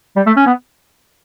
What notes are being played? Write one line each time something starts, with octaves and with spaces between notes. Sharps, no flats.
G3
A3
C#4
B3